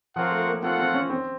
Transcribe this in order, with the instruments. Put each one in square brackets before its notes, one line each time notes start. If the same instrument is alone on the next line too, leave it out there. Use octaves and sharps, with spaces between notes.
[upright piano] F3 [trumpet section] C4 F4 A#4 C#5 F#5
[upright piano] A3
A#3
[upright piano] C4 [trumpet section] F4 A4 C#5 F#5
[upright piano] C4
C#4
C4